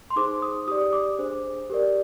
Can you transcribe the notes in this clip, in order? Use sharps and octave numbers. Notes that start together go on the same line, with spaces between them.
C6
D#4 G#4 C5 D6
D#6
G4 D5 D#6
D6
D4 G#4 C5
G4 A#4 D5